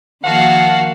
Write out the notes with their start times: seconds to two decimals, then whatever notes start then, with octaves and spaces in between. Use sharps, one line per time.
0.24 D#3 F3 A#3 F#4 F5 F#5 A5